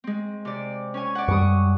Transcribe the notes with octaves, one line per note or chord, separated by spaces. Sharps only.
G#3 C4
C3 D5
C#4 C#5 G#5
D5 F#5
F#2 G3 C#6 D#6